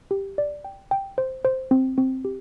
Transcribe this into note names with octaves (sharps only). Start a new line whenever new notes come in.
G4
D5
G5
G5
C5
C5
C4
C4
G4